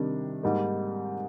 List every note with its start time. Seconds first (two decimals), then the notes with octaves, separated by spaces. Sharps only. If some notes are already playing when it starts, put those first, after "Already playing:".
Already playing: C3 D#3 G3 D4
0.43 G#2 G3 A#3 D#4